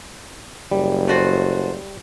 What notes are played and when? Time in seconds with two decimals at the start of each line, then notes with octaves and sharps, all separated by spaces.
0.71 F#1 G3
1.08 A3 F#4 C5